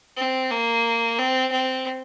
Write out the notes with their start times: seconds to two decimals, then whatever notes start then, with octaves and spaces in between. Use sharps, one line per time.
0.17 C4
0.51 A#3
1.19 C4
1.51 C4